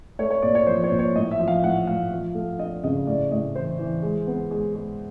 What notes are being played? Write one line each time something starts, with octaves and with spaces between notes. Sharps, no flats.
A3 C#5
C#5
A#2 D5
C#5
F3 C5
C#5
A#2
C#5
A2 D#5
E5
F3
F5
A2 F#5
A2 F5
F3
A3
D4 D#5
C#3 D#5
A2 D5
A2 D#5
E3 C5
E3
G#3
B3
G#3
G#3